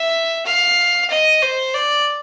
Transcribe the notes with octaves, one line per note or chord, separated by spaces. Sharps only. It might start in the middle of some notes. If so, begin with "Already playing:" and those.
Already playing: E5
F5
D#5
C5
D5